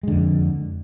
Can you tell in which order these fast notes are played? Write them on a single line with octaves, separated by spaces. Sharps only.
G#3 D3 F2